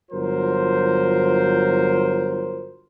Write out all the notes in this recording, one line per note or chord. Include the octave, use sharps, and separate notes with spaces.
G1 F#3 F4 A#4 C5